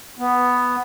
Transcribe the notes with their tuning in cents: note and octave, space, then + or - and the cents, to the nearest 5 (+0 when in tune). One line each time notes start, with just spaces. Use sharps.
B3 +5